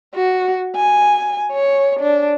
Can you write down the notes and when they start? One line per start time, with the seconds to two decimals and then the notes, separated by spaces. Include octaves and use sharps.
0.15 F#4
0.76 G#5
1.52 C#5
2.00 D4